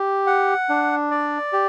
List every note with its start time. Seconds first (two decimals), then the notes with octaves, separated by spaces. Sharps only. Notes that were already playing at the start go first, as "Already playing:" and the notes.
Already playing: G4
0.27 F#5
0.69 D4
1.11 D5
1.53 G4